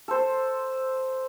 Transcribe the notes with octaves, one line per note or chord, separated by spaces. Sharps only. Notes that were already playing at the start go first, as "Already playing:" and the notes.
A4 C5